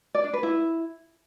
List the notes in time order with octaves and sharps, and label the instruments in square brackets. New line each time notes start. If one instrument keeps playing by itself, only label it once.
[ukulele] D5
D4
B4
E4